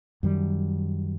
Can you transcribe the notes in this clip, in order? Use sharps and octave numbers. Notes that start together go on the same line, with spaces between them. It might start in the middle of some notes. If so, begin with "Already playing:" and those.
F#2 D#3 G3